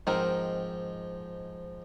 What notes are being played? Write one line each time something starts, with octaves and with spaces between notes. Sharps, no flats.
G#2 D#3 F3 C4 A#4